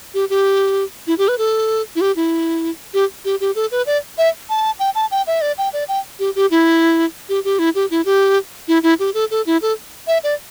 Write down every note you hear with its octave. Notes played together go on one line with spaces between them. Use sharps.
G4
G4
E4
G4
B4
A4
E4
G4
E4
G4
G4
G4
A4
B4
D5
E5
A5
G5
A5
G5
E5
D5
G5
D5
G5
G4
G4
E4
G4
G4
E4
G4
E4
G4
E4
E4
G4
A4
A4
E4
A4
E5
D5